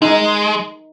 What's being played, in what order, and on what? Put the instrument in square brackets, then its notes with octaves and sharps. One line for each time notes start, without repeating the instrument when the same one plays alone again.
[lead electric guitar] G#3 [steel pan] D#4